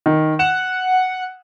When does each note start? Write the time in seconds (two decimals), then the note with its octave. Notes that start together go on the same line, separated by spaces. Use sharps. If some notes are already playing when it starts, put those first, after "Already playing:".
0.06 D#3
0.39 F#5 E7